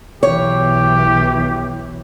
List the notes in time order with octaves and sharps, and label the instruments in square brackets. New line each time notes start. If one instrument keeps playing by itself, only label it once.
[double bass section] B1 E3 [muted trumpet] G4 [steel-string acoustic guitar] C#5